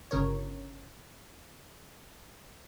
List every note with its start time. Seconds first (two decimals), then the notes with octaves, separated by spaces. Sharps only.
0.11 G1 C#3 A#4 C#5